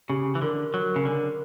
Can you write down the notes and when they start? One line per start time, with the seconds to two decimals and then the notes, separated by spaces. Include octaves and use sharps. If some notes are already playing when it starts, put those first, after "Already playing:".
0.09 C#3 G4
0.35 E3
0.42 D3 A#4
0.74 F#3
0.96 C#3
1.05 D3